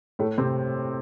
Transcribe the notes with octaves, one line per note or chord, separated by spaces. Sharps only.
A2 A3
C3 C4